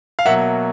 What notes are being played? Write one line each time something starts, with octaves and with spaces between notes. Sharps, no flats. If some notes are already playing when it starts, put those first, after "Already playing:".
F5
B2 F#3 A#3 E5 F#5